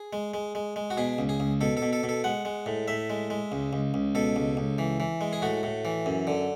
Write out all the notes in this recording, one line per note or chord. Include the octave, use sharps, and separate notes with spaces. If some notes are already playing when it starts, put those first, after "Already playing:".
Already playing: G#4
G#3
G#3
G#3
G#3
F#4
B2 G#4
C#2
G#4
C#2
B2 A4
A4
B2
A4
B2
A4
G#3 F#5
G#3
A2
A2 E5
G#3
G#3
C#2
C#2
C#2
B2 A4
C#2
C#2
E3
E3
G#3
G#4
A2 F#4
A2
E3
F#2
D3